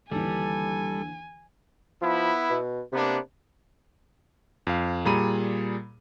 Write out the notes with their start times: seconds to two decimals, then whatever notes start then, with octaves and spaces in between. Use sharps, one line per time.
0.12 D#2 D3 E3 G3 A4 G#5
2.02 F3 B3 E4
2.50 B2
2.93 C3 A#3 B3 D4
4.67 F2 F5
5.05 A#2 G3 G#4 A#5 B5 D#7